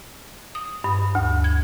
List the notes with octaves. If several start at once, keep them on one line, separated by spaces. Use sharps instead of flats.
D#6
G2
D2
G#6